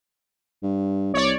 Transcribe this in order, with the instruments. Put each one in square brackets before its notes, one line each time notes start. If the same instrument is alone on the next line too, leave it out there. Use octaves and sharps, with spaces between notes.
[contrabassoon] G2
[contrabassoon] C2 [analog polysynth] C#5 D5